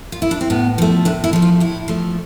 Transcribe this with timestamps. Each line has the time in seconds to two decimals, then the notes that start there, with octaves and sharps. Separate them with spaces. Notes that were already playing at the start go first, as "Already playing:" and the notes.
0.12 F4
0.22 E4
0.31 D4
0.41 C4
0.50 A2 B3
0.78 F3 A3
1.05 A2 D4
1.24 E4
1.33 F3 A3
1.42 F4
1.60 A2 E4
1.88 F3 A3